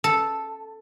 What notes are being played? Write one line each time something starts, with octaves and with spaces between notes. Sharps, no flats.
A4